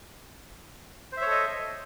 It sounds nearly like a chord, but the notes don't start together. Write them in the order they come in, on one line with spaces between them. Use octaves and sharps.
C5 E5 C#5 A4 D#5